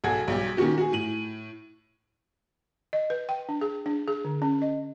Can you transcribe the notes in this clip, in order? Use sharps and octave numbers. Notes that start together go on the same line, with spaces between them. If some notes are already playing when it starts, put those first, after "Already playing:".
B1 G#4 A4 F#5 G#6
B1 G3 G4
A#2 D#3 C#4 F#4 G4
F#4 G#4
A2 D#7 F#7
D#5
B4
G5
D4
G#4
D4
G#4
D3
C#4
D#5